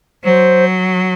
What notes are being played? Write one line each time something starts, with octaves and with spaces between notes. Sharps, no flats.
F#3 C5